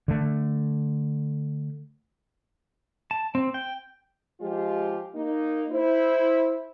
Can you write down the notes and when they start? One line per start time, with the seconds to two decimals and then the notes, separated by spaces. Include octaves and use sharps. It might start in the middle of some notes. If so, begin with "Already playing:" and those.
0.08 D3 A3
3.11 A5
3.35 C4
3.54 G5
4.41 F3 G#3 F4 G4
5.15 A#3 D#4
5.71 E4 C5